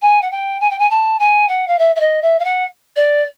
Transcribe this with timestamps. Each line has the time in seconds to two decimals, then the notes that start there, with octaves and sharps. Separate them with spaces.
0.02 G#5
0.22 F#5
0.31 G5
0.61 G#5
0.70 G5
0.79 G#5
0.90 A5
1.20 G#5
1.48 F#5
1.68 F5
1.79 E5
1.96 E5
2.00 D#5
2.22 E5
2.39 F5
2.45 F#5
2.96 D5